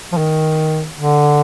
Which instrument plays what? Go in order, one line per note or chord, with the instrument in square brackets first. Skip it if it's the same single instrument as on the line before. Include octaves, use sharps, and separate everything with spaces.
[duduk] F3
D#3
D3